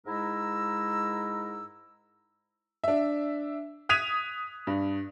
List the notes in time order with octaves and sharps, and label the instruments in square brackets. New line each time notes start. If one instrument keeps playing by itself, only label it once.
[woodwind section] G#2 G#3 E4 A#4 A#5 E6
[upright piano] D4 E5
D#6 F#6 G#6 B6 D#7 F7
G2